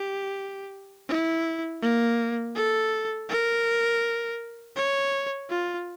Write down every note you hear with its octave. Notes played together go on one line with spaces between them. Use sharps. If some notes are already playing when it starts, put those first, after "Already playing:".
Already playing: G4
E4
A#3
A4
A#4
C#5
F4